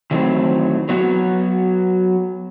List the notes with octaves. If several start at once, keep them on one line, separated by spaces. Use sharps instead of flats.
D#3 E3 F#3 A3 C4
F#3 B3 F#4